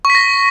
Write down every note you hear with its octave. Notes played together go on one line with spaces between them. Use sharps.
C#6
B6
A#6